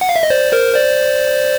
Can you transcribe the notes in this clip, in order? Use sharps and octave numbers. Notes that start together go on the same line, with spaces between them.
F#5
F5
E5
D#5
C5 D5
A#4 C5
C5 D5